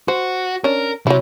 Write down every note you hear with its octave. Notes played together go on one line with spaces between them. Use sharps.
F#4 C5
C#4 D4 A#4
C3 F#3 E4